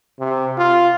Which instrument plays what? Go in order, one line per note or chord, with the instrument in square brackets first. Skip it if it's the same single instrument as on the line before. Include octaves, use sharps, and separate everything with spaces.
[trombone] C3
F4